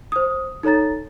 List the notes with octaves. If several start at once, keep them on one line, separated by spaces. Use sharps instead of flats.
C5 D#6
D#4 A4 C#5 A#5 A6